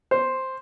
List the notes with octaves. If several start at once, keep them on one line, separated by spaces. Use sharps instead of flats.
C5